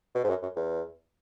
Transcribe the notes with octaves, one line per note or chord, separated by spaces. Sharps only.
B2
G#2
F#2
F#2
E2